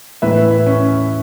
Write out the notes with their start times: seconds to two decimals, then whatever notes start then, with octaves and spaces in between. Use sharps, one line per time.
0.22 A2 E3 B4 E5
0.66 C#4